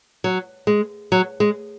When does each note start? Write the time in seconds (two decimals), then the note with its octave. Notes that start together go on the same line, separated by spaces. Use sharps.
0.24 F#3
0.67 G#3
1.12 F#3
1.40 G#3